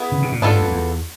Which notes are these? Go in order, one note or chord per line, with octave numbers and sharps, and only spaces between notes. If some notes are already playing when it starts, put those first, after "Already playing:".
Already playing: B3 E4 G#4
C#3
C3
A#2
G#2 B3 D4 F4 A4
G2
F2
E2